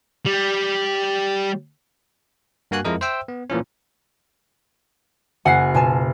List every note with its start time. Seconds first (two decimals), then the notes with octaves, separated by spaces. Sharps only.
0.26 G3
2.71 G2 A#3 F#4 G#5 F#6
2.85 F2 G#3 E4 A#4 D#5
3.01 C5 E5 G5 E6
3.28 B3
3.50 A#2 E3 F3 C#4
5.45 F#1 F#4 F#5 G#5 C7
5.74 B2 F4 G#5 A5